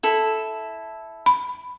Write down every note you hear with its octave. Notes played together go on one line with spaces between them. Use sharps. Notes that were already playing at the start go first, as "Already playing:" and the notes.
E4 A4
B5